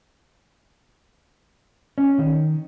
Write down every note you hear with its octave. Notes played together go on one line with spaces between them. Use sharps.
C#4
D#3